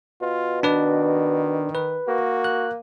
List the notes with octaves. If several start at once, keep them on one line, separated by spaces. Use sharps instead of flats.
B2 F4
D#3 D4 B4 D5
B4
A#3 F#4
F#6